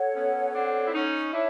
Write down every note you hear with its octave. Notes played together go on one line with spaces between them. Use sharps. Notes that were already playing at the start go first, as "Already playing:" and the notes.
Already playing: A4 C#5 F#5
B3 C#4
C4 D4
E4
C#4 D#4
D4 E4 C#5 E5